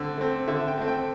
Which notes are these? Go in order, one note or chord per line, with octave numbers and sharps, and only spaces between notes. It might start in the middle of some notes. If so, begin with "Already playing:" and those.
Already playing: D3 A3 C4
A3 C4
D3 E5
G5
A3 C4
G5